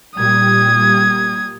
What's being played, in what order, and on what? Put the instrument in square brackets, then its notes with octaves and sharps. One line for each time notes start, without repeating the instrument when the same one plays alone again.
[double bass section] A#2 G3 [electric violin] D#6 G#6